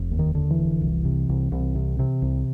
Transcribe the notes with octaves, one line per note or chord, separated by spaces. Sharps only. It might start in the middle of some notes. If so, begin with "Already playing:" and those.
Already playing: F1
D#2
D#3
D3
E3
F1
C2
C3
C2
C2
C3
C3
C2